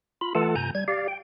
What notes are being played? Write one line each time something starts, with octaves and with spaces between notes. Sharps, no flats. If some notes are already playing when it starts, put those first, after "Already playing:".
F4 B5
E3 A3 F4 A4 F#5 A5
G2 C3 G#5 A#5 G6
G3 G#6
G4 D5 F5
G5